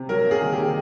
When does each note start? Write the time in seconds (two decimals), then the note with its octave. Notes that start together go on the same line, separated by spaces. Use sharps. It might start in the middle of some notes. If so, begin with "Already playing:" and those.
Already playing: C3
0.09 F#3 A#4
0.26 A#3
0.31 G#4
0.41 D#3
0.53 G4
0.58 D#3